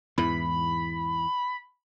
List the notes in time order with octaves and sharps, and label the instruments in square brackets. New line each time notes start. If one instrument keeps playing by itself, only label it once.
[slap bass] E2 G#2 E3 [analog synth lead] B5